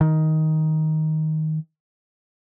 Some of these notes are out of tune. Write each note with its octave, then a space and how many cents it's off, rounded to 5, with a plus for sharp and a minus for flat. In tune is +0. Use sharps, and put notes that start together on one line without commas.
D#3 +10